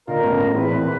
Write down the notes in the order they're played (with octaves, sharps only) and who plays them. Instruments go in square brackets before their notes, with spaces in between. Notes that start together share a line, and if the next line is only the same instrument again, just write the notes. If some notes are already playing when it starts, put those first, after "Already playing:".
[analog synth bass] A#2 [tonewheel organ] D3 [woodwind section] D#4 F4 A#4
[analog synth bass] G2 [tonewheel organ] A3 B3 C#4
[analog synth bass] A2
[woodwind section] E2 B4 [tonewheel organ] E3 C4
[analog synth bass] A#2